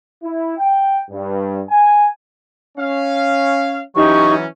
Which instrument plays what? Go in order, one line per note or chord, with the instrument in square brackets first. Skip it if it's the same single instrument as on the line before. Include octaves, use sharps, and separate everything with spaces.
[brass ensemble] E4
G5
G2
G#5
[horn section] C#4 F5
[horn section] E3 F#3 C#4 [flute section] D#4 G4 C#6